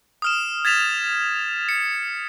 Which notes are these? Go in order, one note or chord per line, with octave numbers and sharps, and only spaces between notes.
D#6 F6 E7
G#6 A6 B6 E7 F7
C#7